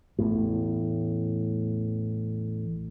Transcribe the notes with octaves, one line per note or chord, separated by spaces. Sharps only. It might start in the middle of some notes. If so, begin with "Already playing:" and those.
A1 E2 A2